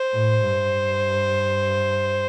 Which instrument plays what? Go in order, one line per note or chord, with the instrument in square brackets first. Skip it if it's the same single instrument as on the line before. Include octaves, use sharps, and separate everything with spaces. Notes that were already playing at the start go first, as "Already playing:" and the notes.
Already playing: [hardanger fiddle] C5
[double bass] A2
G2